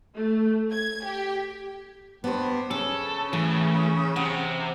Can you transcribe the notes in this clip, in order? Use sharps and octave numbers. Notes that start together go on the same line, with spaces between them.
A3
G#6
G4
G2 B3 C5
C#3 C#4 A4
A2 E3
C3 F#5